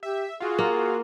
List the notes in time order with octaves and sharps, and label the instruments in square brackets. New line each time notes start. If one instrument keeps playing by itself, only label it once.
[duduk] G4 [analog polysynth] E5
[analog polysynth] F4 F#4 [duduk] G#4
[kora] A#3